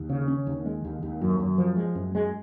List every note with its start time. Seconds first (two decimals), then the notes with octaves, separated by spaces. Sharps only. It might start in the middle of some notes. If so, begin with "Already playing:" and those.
Already playing: D#2
0.10 C#3
0.28 C#4
0.47 D#2
0.66 G#3
0.85 D#2
1.03 D#2
1.21 F#2
1.40 F#2
1.58 F3
1.77 G#3
1.95 F#2
2.15 G#3